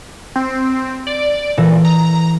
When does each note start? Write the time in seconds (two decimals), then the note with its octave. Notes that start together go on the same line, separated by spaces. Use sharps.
0.36 C4
1.07 D5
1.58 A#2 E3 A4 A#6
1.85 A#5